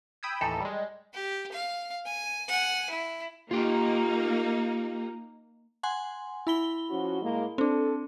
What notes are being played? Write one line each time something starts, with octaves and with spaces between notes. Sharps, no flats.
G5 B5 D#6 E6 G6 G#6
D#2 A2 E3 D#4 A4 E6
G3 G#3
G4
F5
G#5
F#5 G#5
E4
A#3 D#4 F4 G4
F#5 G#5 C6
E4 B5 G7
F3 C#4 F#4
A2 G#3 A#3
C4 D4 A4